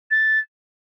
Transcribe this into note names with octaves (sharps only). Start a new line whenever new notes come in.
A6